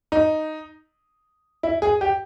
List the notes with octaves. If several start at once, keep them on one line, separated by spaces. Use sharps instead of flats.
D#4
E4
G#4
G4